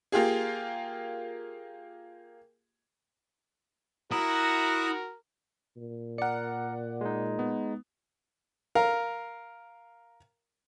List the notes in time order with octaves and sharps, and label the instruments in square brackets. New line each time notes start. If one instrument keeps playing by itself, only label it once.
[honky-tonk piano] A#3 F4 G4 G#4
[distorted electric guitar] E4 [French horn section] F#4 [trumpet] A#4 [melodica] A#5 D#6
[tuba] A#2
[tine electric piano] A#4 C#7 [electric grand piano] D5 F#5
[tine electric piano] G#3 D#4
[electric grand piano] B3
[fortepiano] A#4 F5